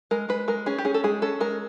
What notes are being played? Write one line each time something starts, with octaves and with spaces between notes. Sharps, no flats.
G#3 A#4
G#3 B4
G#3 A#4
C#4 G#4
G4
C#4 G#4
A4
G#3 G#4
C#4 A4
G#3 A#4